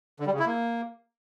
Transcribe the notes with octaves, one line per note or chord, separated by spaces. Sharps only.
D3
G3
C#3
E4
A#3